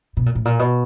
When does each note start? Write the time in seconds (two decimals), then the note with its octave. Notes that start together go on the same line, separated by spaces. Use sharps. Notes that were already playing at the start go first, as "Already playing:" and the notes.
0.17 B2
0.26 A#2
0.35 A2
0.45 A#2
0.59 B2